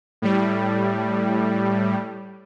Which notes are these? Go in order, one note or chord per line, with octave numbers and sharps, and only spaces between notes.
A2 G3